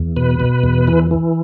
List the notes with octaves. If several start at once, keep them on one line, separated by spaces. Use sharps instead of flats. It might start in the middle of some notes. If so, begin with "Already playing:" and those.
Already playing: E2
B2 B4
B2
E2
E3
E3